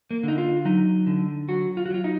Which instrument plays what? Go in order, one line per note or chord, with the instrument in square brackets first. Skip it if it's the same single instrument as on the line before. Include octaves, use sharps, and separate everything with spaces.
[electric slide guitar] A#3
D3 D#4
F4
F#3 D#4
D3
F#3 F#4
F4
F#4
F#3 F4
D#4